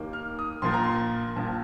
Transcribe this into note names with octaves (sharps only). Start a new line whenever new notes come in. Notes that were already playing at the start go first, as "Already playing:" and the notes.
Already playing: D#2 D#3 A#3
F6
D#6
A#1 A#2 F3 C6
A#5
C6
A#1 A#2 F3 A5